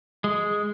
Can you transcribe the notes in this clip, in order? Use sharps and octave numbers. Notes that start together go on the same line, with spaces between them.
G#3